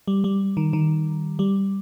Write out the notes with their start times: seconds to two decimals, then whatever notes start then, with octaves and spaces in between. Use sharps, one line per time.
0.08 G3
0.24 G3
0.57 D#3
0.73 D#3
1.39 G3